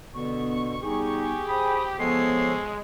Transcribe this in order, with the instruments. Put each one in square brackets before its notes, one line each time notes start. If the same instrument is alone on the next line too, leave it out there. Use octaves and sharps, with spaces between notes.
[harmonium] B2 D3 [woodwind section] B3 [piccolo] C#6
[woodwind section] G3 B3 D#4 [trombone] G4 [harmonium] G#4
[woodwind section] C5 G5 B5 [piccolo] D#6
[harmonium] F3 A4 C#5 [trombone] G#3 [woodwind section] B3 [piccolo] C7